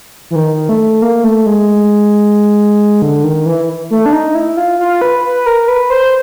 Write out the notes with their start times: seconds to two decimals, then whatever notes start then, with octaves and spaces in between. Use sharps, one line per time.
0.31 E3
0.36 D#3
0.69 A3
1.02 A#3
1.24 A3
1.46 G#3
3.02 D3
3.24 D#3
3.46 E3
3.90 A3
4.06 D4
4.13 D#4
4.35 E4
4.57 F4
4.79 F4
5.01 B4
5.24 B4
5.46 A#4
5.68 B4
5.90 C5